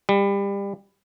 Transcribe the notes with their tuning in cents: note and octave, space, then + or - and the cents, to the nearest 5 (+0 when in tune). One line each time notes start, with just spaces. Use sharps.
G3 +25